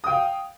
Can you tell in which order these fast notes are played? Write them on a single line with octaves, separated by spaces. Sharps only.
D#6 G5 F5